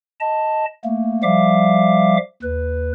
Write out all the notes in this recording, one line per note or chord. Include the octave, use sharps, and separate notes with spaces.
D#5 A5
A3 A#3
F3 G3 E5 F5 D6
D#2 B4